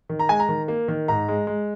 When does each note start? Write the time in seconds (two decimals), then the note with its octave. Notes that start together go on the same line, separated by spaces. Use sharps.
0.09 D#3
0.19 A#5
0.29 G#3 G#5
0.40 A#5
0.49 D#3
0.68 A#3
0.88 D#3
1.08 G#2 A#5
1.29 G#3
1.47 G#3